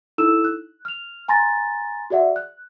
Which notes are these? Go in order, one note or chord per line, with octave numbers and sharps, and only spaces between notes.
D#4 E4 A4 E6 E7
F#6
F6 F7
G#5 A#5 C6 A6 A#6
F#4 G#4 D5 E5 F#5
F#6